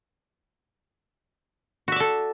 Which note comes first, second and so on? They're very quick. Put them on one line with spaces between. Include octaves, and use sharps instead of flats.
F#4 E5 D5 A4